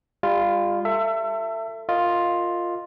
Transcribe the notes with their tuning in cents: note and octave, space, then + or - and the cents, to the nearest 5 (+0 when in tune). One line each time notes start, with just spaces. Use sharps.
G3 +35 F4 +0
A4 +35 E5 +20
F4 +5 A#4 -25 D#5 +0